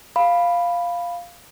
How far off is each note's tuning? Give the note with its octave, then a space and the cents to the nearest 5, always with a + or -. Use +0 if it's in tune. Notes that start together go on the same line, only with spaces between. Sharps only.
F5 +0 B5 +0